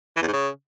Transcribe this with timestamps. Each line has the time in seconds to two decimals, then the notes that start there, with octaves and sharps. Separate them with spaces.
0.16 E3
0.22 E2
0.27 G#2
0.33 C#3